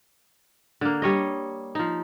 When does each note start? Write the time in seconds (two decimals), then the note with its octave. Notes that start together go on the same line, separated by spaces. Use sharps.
0.81 D3 A#3
1.02 G3 C#5 D#5
1.75 F3 D#4